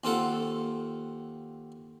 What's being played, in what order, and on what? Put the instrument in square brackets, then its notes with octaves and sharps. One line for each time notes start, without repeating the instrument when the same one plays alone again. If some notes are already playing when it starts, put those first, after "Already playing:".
[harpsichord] D#2 C4 F4 A4 F#5